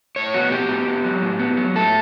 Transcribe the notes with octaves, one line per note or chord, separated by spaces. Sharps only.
A2 C#5
B3 F#4
A2 G4
B3
B3
F#3
A2
B3
F#3
A2 A4